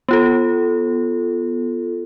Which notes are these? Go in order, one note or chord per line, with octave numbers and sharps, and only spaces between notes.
B3 F4 A4